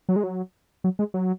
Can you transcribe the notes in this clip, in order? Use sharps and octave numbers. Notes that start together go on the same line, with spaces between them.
F#3
G#3
F#3
F#3
G#3
F#3